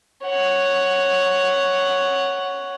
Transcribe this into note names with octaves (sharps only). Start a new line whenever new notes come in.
C#5 F#5